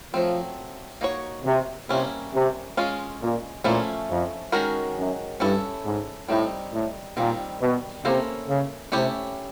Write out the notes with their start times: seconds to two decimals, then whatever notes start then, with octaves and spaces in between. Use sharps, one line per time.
0.13 F3 F#3 A3 C4
1.01 A#3 D#4 F#4 A#4 C#5
1.45 C3
1.89 C3 G3 A#3 C#4 E4
2.33 C3
2.77 G#3 C#4 F4
3.21 A#2
3.64 A#2 F3 A3 C#4 E4
4.09 F2
4.52 D#3 G#3 C#4 F#4 A#4
4.96 F#2
5.40 G2 C#4 E4 A4
5.84 G#2
6.28 A2 G3 C4 D#4
6.72 A2
7.17 A#2 D#3 G3 C4
7.61 B2
8.04 C3 A#3 C#4 E4 A4 C5
8.48 C#3
8.92 C3 A3 C#4 E4 G4